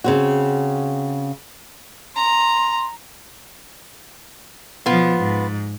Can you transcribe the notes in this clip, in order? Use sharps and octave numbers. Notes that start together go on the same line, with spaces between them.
C#3 C4 F#4
A#5 C6
B2 F3 B3 F4
G#2